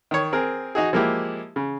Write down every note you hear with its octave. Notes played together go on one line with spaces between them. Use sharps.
D#3 C#5
C4 G#4 A#4
D#4 F#4 G#4
F3 G#3 A#3 E4 G4
C#3